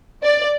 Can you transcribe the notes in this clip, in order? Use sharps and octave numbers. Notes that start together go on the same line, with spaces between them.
D5